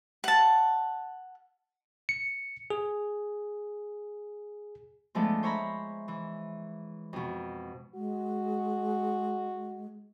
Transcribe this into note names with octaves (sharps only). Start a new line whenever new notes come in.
F#5 A5
C#7
G#4
F3 G#3 A3 B3 D4
C5 C#5 E5 A#5 B5
E3
F2 B2
G#3 F#4